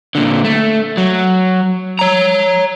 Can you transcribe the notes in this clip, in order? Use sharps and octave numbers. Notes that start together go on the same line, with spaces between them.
A#2 D3
A3
F#3
C#5 A#5